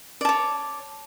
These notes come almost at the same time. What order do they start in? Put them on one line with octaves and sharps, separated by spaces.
D5 A5 C#5